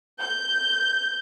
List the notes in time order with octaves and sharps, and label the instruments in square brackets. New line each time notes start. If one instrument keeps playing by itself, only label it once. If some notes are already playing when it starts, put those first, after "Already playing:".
[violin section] G6